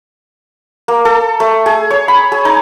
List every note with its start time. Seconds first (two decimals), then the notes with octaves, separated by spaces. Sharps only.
0.88 A#3
1.05 A4
1.40 A3
1.66 G#4
1.90 C#5
2.08 B5
2.32 G#4
2.45 D#4